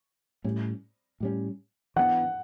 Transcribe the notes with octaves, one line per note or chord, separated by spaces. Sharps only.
A2 G3 C#4
A2 G3 C#4
E3 B3 D4 F#5